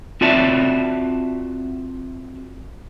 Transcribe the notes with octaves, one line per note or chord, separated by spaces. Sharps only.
C4 F4 F#4 D5 E5 A5